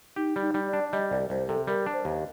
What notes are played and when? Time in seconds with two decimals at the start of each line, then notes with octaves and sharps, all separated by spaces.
0.16 D#4 G4
0.36 G3
0.42 D#4
0.54 G3
0.67 D5
0.73 D4
0.92 G3 D#5
1.11 C2 D5
1.30 C2 C5
1.48 C3 A4
1.67 G3 A#4
1.86 D4
1.93 C5
2.05 D#2